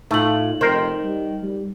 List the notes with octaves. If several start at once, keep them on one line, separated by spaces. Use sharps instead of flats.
A2 A3 D#4 F4 F#7
F1 D#3 A#4 C5
G3
G3